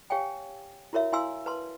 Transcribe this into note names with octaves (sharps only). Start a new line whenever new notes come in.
G4 C#5 F5 G5 G#5
E4 F#4 A#4 C#5 E5
E4 F5 G#5 C6 E6
B4 A5 C6